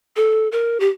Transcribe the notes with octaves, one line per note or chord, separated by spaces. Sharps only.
A4
A#4
G4